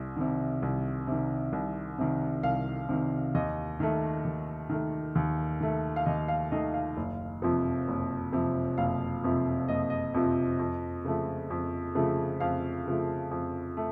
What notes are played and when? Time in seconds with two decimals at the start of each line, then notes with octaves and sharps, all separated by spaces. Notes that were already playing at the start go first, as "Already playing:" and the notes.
Already playing: C2
0.16 C3 D#3
0.62 C2
1.07 C3 D#3
1.53 C2
1.98 C3 D#3
2.43 C2 F5
2.89 C3 D#3
3.34 D#2 D#5
3.80 D#3 A3
4.25 D#2
4.70 D#3 A3
5.15 D#2
5.60 D#3 A3
5.96 F5
6.06 D#2 D#5
6.28 F5
6.51 D#3 A3 D#5
6.74 F5
6.97 F#1
7.42 F2 C3 F3
7.88 F#1
8.33 F2 C3 F3
8.78 F#1 F5
9.24 F2 C3 F3
9.68 F#1 D#5
9.90 D#5
10.14 F2 C3 F3
10.59 F2
11.04 C#3 F3 A3
11.50 F2
11.95 C#3 F3 A3
12.40 F2 F5
12.86 C#3 F3 A3
13.31 F2
13.77 A3